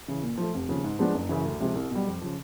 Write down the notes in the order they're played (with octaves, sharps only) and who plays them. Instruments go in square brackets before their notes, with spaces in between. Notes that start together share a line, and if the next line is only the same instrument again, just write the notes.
[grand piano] C#3 E3
A#2
F3 A3
F1
D#2 C#3 F3
G#2
F3 G#3 B3 D4
F#1
F#2 C#3 E3
D2
C3 F3 G#3
C2
B2 G3
F2
C#3 F3